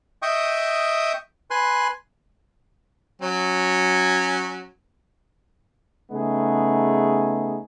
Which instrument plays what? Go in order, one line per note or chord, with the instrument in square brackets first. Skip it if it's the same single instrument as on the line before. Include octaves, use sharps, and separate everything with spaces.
[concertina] D#5 E5 G5 C#6 D#6
B4 G#5 C6 F#6
[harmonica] F#3 C#4
[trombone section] C#3 A3 B3 D#4 G#4